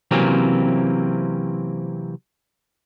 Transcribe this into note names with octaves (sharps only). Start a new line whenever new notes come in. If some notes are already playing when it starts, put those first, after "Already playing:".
C3 E3 F#3 A#3 C4 C#4